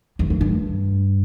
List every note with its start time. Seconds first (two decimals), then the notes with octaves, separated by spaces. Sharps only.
0.19 E2
0.30 F2
0.41 G2